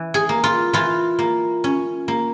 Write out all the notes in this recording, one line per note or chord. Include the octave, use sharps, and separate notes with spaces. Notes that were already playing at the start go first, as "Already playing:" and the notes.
Already playing: E3
G#4
A#3
F4
E3 F4
A#3
C#4
A#3